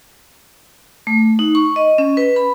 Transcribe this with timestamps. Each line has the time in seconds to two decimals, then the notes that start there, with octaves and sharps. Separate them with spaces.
1.07 A3
1.39 D#4
1.55 C#6
1.76 D#5
1.98 C#4
2.17 B4
2.36 B5